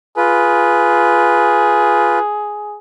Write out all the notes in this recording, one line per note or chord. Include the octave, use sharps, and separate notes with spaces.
F4 G#4 B4